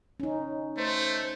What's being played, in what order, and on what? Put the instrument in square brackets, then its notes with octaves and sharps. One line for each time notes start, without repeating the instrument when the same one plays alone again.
[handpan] C#4 D#4
[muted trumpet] A3 [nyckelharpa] C5